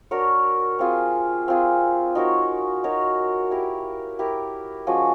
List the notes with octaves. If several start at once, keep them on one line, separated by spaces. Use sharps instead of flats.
D4 F#4 A#4 C#5
C4 F4 G#4
C4 F4 G#4
D#4 F#4 A#4 C#5
D#4 F#4 A#4 C#5
E4 G4 A#4
E4 G4 A#4
F3 G#3 C#4 F#4